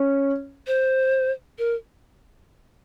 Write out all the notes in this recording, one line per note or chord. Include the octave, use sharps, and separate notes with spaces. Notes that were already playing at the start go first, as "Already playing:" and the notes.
Already playing: C#4
C5
A#4